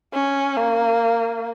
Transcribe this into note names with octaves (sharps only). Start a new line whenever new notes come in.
C#4
A#3